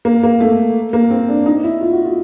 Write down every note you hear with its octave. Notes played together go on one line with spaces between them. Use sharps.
A#3
A#3
A3
A#3
C4
D4
D#4
E4
F4
F#4
F4